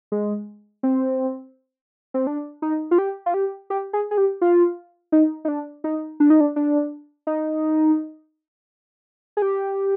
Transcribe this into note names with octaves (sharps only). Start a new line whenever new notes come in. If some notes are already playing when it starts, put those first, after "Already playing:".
G#3
C4
C4
D4
D#4
F4
G4
F4
G4
G4
G#4
G#4
G4
F4
D#4
D#4
D4
D#4
D4
D#4
D4
D4
D#4
G#4
G4